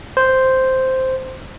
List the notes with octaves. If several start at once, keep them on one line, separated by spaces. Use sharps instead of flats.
C5